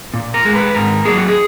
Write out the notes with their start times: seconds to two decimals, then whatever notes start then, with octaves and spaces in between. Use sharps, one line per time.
0.14 A#2
0.34 A#4
0.45 G#3
0.55 B4
0.75 G#2 A#4
1.05 F#3 A#3 G#4
1.17 F#4
1.28 G#4